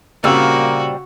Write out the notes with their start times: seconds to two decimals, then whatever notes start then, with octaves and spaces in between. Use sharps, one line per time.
0.24 A#2 C#3 G3 A#3 C4 F#4 E6